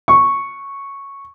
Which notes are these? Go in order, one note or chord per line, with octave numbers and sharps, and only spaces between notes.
C#6